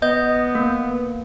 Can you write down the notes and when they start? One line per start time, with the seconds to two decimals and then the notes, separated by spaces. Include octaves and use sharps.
0.02 B3 D#5 G6
0.55 A#3